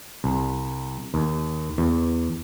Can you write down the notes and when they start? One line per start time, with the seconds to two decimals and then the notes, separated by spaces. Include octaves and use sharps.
0.24 C2
1.14 D#2
1.78 E2